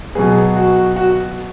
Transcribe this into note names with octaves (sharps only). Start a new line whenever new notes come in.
B2 F#3 B3 G#4
F#4
F#4